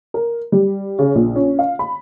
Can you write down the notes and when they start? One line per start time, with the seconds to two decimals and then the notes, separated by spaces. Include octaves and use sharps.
0.14 A#4
0.52 G3
0.99 C#3
1.15 A#1
1.36 C#4
1.59 F5
1.79 B5